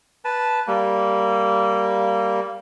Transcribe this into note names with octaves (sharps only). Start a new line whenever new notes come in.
B4 A5
G3 A#3